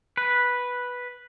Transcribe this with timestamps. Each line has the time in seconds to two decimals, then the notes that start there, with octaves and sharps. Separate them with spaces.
0.17 B4